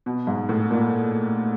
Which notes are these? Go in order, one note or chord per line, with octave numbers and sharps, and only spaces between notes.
B2
G#2
A2
A#2